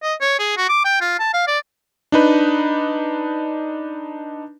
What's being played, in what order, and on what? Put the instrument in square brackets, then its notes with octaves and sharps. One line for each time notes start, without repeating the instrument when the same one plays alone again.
[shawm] D#5
C#5
G#4
F#4
D6
G5
F4
A5
F5
D5
[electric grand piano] D4 D#4 B4